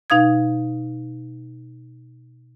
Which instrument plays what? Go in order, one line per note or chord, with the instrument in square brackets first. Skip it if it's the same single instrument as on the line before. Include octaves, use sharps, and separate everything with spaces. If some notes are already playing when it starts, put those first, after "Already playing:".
[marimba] B2 D#4 F5 D#6 G#6